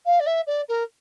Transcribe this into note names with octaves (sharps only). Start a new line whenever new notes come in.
F5
D5
E5
D5
A#4